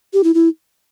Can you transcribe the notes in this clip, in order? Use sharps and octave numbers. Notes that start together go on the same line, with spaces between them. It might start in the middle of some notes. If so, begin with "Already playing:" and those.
G4
E4
E4